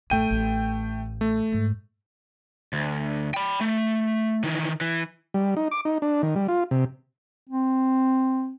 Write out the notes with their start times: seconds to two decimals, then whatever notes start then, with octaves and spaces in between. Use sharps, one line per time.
0.10 A1 A3 G5 D#7
0.31 A1
1.21 A3
1.52 G#2
2.73 D2
3.34 G5 B5
3.61 A3
4.44 D#3 E3
4.81 E3
5.34 G3
5.57 D#4
5.71 D6
5.85 D#4
6.02 D4
6.23 D#3
6.36 G3
6.48 F4
6.71 C3
7.50 C4